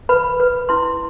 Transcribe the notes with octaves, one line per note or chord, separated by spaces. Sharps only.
B4 B5
B4
E4 C6